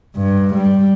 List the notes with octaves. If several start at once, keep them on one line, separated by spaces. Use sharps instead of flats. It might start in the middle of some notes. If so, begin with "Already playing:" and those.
G2
G3